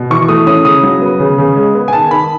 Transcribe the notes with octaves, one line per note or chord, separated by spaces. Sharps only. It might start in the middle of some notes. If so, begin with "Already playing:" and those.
Already playing: B2
E3 C#6
A3 D#6
C#4 D#6
C#3 D#6
F#3
B3
C#3
C#3
G#3
B3
G#5
D#3 A5
D#3 B5